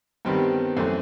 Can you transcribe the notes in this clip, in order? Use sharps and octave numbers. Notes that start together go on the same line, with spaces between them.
G2 D#3 G3 B3 C4
F#2 E3 A3 C4